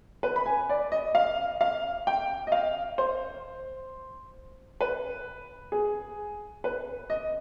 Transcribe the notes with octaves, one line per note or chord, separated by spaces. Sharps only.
B4
B5
G#5
D5
D#5
F5
F5
G5
D#5
F5
C5
B4
G#4
B4
D#5